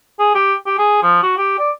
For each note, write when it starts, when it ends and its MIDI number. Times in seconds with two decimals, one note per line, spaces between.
0.19 0.32 68
0.35 0.54 67
0.66 0.77 67
0.78 1.00 68
1.02 1.20 53
1.23 1.36 66
1.37 1.55 67
1.59 1.70 74